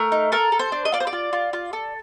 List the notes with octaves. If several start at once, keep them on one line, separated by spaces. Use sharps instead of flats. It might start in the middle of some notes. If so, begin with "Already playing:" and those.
Already playing: A3 A#4
D#4
A4 A#4
A4
C5
D4
D#5
F4 D5
C5
D5
F4
F4
F4
A4